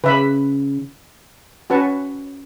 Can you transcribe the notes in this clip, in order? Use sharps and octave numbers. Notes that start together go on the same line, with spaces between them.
C#3 B4 E5 B5
C#4 F#4 B4 A5 C#6